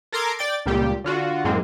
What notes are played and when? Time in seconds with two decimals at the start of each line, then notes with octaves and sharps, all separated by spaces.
0.12 A4 A#4 A#5 C6 D6 G#6
0.39 D5 G5 A6
0.66 C#2 A#2 G3 G4
1.04 D3 F4 F#4
1.44 F#2 A2 G#3 A#3 C4